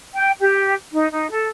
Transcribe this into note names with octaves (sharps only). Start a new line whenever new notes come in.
G5
G4
D#4
D#4
A4